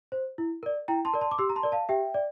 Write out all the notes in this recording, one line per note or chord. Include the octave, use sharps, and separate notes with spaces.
C5
E4
A#4 D5
E4 G5 A#5
A5 C6
A#4 D5
A5 C6
D6
G4 C6 E6
A#5
A5 C6
A#4 D5
F5 A5
G4 E5 G5
D5